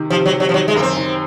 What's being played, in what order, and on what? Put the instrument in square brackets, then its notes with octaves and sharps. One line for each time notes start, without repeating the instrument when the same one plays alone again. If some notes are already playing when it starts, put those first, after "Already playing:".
Already playing: [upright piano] C3 D#3
[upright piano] C3 [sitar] F3
[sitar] F#3
[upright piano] C3
[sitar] F#3
F3
[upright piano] D#3 [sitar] F#3
[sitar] G#3
[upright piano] F#2 [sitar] A#3
[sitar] C4
[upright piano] D#3